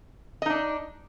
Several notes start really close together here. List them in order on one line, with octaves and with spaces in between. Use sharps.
D#5 D#4 D4